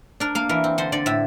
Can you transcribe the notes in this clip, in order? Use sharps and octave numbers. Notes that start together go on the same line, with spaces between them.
D4 A#4
A#3 F5
E3 A#4
C4
D3 C5
D3 D5
A2 E5